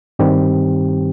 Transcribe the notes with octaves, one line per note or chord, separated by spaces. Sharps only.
G2 D#3 G3 C4 G4